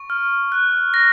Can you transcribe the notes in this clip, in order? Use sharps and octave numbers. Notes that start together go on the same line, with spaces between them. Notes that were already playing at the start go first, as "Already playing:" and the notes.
Already playing: C#6
F6
F#6
A#6